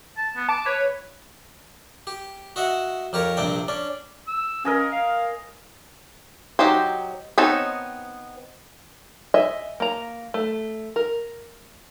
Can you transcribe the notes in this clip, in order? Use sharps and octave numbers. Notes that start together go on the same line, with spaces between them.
A5
B3
A5 D6
B4 C#5
G4
F#4 D#5 E5 F#5
F2 G4 A#4 C#5 A#5
A#1 G2 C3 C4 D4 G5
C#4 D4 D5
E6
C#4 A#4 D#5 G#5
F5
F#3 D#4 G4 C5
B3 C4 D#4 C#5 A5
D#5 E5 G#5
A#3 A#5
A3
A#4